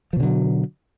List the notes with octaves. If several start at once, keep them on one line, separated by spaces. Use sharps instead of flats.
B2 D3 F3 F#3